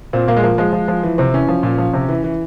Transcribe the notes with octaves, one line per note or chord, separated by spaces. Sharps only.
A#2 C4
A#2 A#3
G#3
F3 A#3
F3 G#3
F3
F3
E3
C3 C4
E3 C#4
F3
A#2
F3
C3
E3
E3